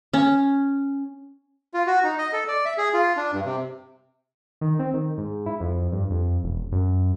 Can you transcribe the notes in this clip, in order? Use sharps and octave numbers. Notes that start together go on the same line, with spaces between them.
C#4
F4
F#4
D#4
D#5
A4
D5
E5
G#4
F4
D4
G2
C3
D#3
C4
D#3
G#2
E4
F2
G2
F2
E1
F#2